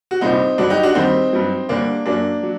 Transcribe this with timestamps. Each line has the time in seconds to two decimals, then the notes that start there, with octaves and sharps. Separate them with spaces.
0.11 F#4
0.21 C2 A#2 G3 C4 D#4
0.58 G2 D3 F#3 D4 F#4
0.70 D#4 G4
0.83 D4 F#4
0.95 D#2 D#3 G3 C4 D#4
1.33 G2 F#3
1.69 D2 D3 G3 A#3 D4
2.06 F#2 F#3 A#3 D4
2.43 F#3